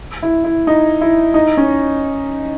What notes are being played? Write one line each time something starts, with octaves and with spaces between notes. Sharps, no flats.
E4
E4
D#4
E4
D#4
C#4